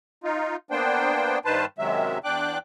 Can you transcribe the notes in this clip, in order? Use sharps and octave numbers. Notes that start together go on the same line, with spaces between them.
D#4 F4
A#3 B3 D4 C5 G5
G2 D#3 B4 C5 A5
F#2 C3 D#3 F#3 G#3 E5
E2 D4 G5 D6 F#6